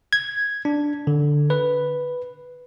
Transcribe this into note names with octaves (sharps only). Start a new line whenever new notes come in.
G#6
D4
D3
B4